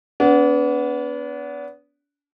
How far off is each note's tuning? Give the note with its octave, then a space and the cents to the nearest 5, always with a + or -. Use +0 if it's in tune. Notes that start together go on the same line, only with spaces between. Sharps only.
B3 +0 D4 -40